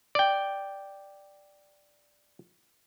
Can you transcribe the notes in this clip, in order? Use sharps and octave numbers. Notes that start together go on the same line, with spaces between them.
D5 G5